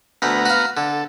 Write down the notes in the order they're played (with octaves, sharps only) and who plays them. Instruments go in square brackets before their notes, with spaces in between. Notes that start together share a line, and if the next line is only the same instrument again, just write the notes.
[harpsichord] D2 A3 [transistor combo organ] B3 A#5
[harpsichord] F#4 F5
[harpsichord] D3 [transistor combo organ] A4